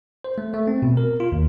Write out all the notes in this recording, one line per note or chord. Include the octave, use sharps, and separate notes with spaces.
C5
A3
A3
C4
B2
A#4
F4
D#2